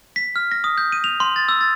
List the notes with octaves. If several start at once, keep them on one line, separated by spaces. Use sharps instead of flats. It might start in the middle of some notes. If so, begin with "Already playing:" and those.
B6
F6
A#6
D#6
G6
D#7
F7
C6
A6
E6
A6